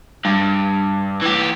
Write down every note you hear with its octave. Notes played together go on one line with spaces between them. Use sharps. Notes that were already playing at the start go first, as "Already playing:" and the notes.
G2
E3 G4